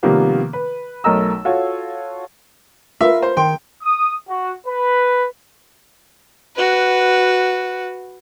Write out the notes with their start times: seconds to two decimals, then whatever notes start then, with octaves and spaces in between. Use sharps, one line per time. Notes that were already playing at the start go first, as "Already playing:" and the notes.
0.03 C3 D#3 F3 G3 A#3 B3
0.53 B4
1.04 B1 A3 A#4 D#5 A#5 E6
1.45 F4 F#4 A4 C#5
3.01 F4 A#4 B4 E5
3.22 C5
3.37 D#3 G5 C6
3.82 D#6
4.29 F#4
4.67 B4
6.56 F#4 B4